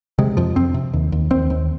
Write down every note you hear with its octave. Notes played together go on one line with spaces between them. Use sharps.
C3 G#3
F2 F3
F2 C4
C3
D#2
D#2
D#2 C4
D#2